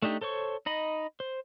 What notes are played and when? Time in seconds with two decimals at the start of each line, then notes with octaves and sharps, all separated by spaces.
0.02 A3 D4 D#4 G4
0.21 A4 C5 C#5 C#6
0.66 D#4 D#5 B5
1.20 C5